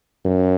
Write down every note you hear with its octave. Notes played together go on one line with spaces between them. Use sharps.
F#2